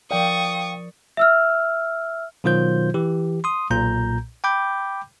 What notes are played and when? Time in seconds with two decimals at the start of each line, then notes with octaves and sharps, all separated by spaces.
0.11 F3 A#4 D5 F5 G5 C#6 D#6
1.17 E5 E6 F6
2.44 B2 D#3 F#3 F4 C5 G6
2.94 E3 G4
3.44 C6 D#6
3.70 B1 A#2 A#5 G6
4.44 G5 B5 D6 G6